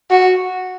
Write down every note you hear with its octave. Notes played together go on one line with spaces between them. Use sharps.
F#4